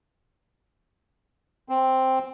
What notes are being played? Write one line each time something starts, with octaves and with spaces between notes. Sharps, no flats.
C4